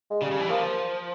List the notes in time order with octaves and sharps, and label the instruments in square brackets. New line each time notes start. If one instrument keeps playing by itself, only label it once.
[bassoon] G#3
[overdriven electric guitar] C#3 [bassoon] G3
[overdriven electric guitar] C#3
E3
[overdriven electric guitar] F3 [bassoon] A#3